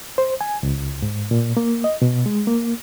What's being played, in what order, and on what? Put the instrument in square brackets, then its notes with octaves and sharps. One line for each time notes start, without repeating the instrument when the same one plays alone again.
[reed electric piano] C5
G#5
C#2
G#2
A#2
A#3
D#5
B2
G#3
A#3